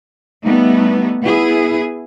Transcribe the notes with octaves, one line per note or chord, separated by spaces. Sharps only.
G3 A3 B3 D#4
B3 E4 G#4